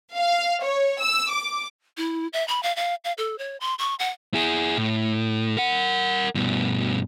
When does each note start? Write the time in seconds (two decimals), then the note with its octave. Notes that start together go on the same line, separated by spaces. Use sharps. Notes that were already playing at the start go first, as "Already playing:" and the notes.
0.16 F5
0.63 C#5
1.01 E6
1.30 D6
1.97 E4
2.33 E5
2.48 B5
2.63 F5
2.76 F5
3.05 F5
3.18 A4
3.39 C#5
3.60 C6
3.79 C#6
3.99 F#5
4.34 E4 G#4
4.78 A2
5.57 A#4 F#5
6.35 G2 B2